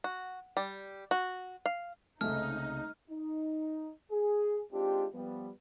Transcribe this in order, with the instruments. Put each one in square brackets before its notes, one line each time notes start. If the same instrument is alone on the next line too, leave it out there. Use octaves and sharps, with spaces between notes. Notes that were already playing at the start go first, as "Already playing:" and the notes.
[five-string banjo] F#4
G3
F#4
F5
[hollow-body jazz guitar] C2 C#3 G#3 [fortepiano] A3 [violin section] D#4 [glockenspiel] F6
[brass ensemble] D#4
G#4
G#3 C4 D4 D#4 F4 G4
F3 G3 B3